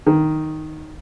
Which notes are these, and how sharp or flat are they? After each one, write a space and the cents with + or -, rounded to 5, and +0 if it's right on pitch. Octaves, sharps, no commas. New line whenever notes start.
D#3 +0